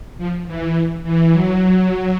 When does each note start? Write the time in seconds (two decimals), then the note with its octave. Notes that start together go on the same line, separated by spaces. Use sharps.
0.18 F3
0.47 E3
1.04 E3
1.33 F#3